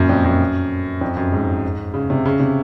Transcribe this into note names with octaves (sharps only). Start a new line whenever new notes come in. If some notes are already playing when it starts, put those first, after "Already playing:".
Already playing: F#2 A#2
F2
F#2
F2
F#2
G#2
C#3
C3
C#3
C3